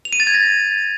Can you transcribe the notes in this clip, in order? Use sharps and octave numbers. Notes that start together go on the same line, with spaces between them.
F7
D#7
A6
G#6
A#6